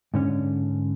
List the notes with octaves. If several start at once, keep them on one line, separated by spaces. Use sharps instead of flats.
G#2 D3 C#4